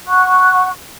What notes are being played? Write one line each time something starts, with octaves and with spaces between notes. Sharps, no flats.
F#5 C#6 F#6